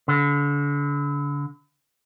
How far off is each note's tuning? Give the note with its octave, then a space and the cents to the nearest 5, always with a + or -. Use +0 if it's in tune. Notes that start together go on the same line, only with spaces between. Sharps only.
D3 -35